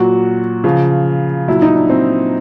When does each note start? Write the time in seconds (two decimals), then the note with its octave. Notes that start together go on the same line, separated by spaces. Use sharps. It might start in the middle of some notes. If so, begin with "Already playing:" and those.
Already playing: A#2 F#3 F#4
0.64 C#3 F3 F4
1.48 A#2 F#3 E4
1.62 D#4
1.76 D4
1.90 C4